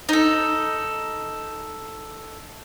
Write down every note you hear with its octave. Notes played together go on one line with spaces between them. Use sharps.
D#4 A4